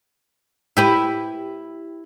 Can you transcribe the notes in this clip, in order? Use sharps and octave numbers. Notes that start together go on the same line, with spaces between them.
E4 G4 B4